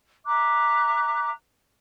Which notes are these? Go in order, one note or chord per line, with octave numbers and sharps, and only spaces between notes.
E5 A#5 D6 F#6